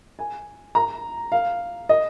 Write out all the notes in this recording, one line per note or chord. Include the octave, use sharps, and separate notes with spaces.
G#5
A#5
F5
D#5